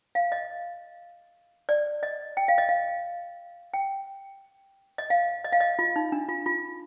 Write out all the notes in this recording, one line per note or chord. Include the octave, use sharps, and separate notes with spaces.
F5
D#5
D5
D#5
G5
F5
D#5
F5
G5
D#5
F5
D#5
F5
D#5
F4
D#4
D4
F4
F4